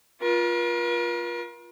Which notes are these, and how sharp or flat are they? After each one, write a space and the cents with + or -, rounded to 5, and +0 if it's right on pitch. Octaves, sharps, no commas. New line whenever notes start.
F4 +0 A#4 +45